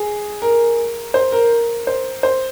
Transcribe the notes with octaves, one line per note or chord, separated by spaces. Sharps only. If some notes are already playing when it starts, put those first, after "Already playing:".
Already playing: G#4
A#4
C5
A#4
C5
C5